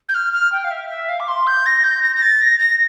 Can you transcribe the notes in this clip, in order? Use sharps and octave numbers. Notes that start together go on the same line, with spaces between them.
G6
F6
F6
G5
F5
E5
E5
F5
D6
C6
G6
A#6
G6
A#6
A#6
A6
A#6
A#6